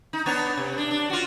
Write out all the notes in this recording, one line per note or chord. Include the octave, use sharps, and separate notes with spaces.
D#4
B3 D4 C#5
C3
D4
D4
F4 F#4